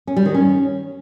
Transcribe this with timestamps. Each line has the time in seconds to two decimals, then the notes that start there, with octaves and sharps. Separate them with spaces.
0.07 C#4
0.16 G3
0.25 D#3
0.35 C#4